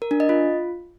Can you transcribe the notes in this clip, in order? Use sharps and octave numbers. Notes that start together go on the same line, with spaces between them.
A#4
D4
D#5
F4